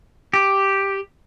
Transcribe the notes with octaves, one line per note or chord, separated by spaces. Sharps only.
G4